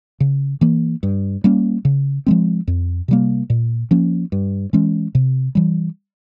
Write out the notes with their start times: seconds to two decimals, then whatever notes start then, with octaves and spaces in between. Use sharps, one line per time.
0.20 C#3
0.61 E3 A#3
1.03 G2
1.44 G3 A#3 C#4
1.85 C#3
2.26 F3 G#3 C4
2.67 F2
3.08 C3 G3 A#3
3.50 A#2
3.91 F3 A#3 C#4
4.32 G2
4.73 E3 G#3 C#4
5.15 C3
5.55 E3 G3